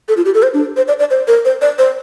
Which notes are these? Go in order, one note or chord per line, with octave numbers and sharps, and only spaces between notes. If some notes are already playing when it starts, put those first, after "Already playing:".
A4
F4
G4
A4
C5
D4
C5
D5
D5
C5
A#4
C5
D5
C5